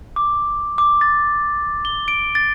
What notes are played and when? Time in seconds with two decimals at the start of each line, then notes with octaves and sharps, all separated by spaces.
0.16 D6
0.78 D6
1.01 A6
1.85 G7
2.08 D7
2.35 A6